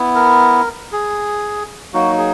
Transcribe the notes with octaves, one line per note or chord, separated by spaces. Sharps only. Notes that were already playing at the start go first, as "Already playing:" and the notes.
Already playing: B3 E4
A#4
G#4
F#3 A#3 D#4 F#4
G#4